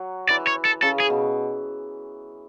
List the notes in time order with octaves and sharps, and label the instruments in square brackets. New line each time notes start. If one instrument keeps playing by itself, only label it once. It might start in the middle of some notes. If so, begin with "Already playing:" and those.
Already playing: [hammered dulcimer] F#3
[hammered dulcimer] E3 [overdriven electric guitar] D5
[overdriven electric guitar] C#5
A4
[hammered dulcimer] C#3 [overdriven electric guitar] A4
[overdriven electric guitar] G#4
[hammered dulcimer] B2